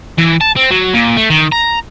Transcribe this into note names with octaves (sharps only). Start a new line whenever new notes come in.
E3
A5
C4
F#3
A#2
A3
D#3
A#5